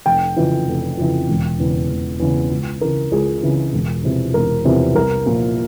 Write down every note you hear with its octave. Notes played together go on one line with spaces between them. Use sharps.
F1 G5
F2 C#3 E3
F1
F2 C#3 E3
E1
E2 C#3
E1
E2 C#3
C#2
C#3 E3 A#4
C#2 G#4
C#3 E3
E1
E2 C3 F3
E1 A#4
E2 C3 F3
C2 A#4
A#2 F3